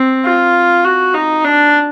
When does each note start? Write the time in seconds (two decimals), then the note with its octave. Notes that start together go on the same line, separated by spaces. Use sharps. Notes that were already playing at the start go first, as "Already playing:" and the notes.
Already playing: C4
0.25 F4
0.85 F#4
1.14 D#4
1.44 D4